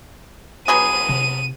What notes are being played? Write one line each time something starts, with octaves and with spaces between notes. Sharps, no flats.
F#3 B3 G#4 D#7
C3 C4